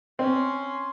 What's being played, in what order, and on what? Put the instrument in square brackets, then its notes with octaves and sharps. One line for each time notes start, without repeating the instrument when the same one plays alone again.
[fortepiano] C4 [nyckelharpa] C#4 [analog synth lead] C6